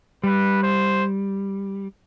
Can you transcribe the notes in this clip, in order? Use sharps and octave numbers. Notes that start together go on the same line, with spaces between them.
G3 B4
C5